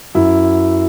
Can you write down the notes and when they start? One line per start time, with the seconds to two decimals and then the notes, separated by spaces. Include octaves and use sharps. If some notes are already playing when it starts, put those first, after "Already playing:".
0.15 F#2 E4